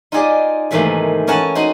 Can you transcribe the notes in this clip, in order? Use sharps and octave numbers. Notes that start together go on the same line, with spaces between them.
D#4 F4 G4 G#4 D5 D#5
G#2 C3 D#3 E3 A3 A#3
E3 C#4 A#4 C#5 F#5 A5
D#4 F#4 C5 D#5